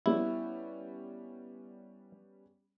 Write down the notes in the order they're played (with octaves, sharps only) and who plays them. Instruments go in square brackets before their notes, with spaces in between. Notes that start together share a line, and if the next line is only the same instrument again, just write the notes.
[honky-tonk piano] G3 B3 C#4 [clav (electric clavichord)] E4